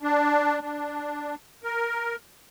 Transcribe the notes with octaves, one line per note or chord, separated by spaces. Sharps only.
D4
D4
A#4